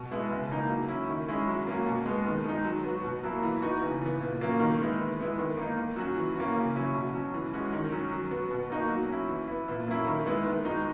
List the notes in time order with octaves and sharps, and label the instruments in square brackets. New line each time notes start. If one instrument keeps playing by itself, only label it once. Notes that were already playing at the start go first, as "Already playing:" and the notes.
Already playing: [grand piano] B2
G#3 B3 E4
C#3
E3 A#3 D#4
F#3
C#4 E4
D#3
G#3 C#4 E4
F#3
A#3 C#4 F#4
B2
G#3 B3
D#3
G#3 D#4
F#3
B3 F#4
B2
F#3 A#3 E4
E3
B3 D#4 F#4
C#3
E3 B3
A#2
F#3 A#3 C#4
D#3
G#3 B3 E4
E3
G#3 B3 E4
D#3
A#3 D#4
D#3
F#3 C#4 F#4
E3
A#3 C#4 F#4
C#3
F#3 C#4 E4
B2
F#3 C#4
E3
G#3 C#4 F#4
D#3
F#3 C#4
F#3
B3 F#4
B2
A#3 D#4 F#4
F#3
C#4 E4
E3
B3 E4
A#2
F#3 A#3 C#4 E4
D#3
G#3 B3 E4
D#3
G#3 D#4 F#4